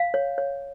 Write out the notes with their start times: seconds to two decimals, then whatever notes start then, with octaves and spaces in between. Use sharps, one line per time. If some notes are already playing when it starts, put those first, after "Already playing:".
Already playing: F5
0.14 C#5
0.38 C#5